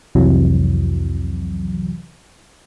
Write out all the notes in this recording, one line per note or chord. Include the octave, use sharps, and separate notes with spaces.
C2 F2 C3 E3 F#3